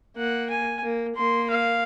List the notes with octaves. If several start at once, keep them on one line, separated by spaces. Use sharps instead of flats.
A#3 F#5
G#5
A#3
A#3 C6
F5